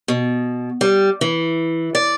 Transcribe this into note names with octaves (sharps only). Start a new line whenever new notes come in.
B2
G3
E3
D5